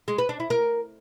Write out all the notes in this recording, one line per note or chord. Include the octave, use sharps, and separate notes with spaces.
G#3
B4
D4
E4
A#4